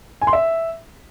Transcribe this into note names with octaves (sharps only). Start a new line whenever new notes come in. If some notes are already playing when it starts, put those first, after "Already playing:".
G#5
C6
E5